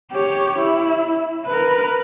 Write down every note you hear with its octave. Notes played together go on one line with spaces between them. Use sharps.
G4 C#5
E4
A#4 B4